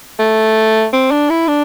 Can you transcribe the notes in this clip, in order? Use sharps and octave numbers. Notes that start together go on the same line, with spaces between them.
A3
C4
D4
E4
D4